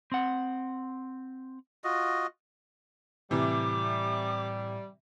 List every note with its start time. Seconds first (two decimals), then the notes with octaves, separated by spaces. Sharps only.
0.12 C4 F#5
1.84 F4 F#4 D#5
3.31 A2 C3 E3 G3 D6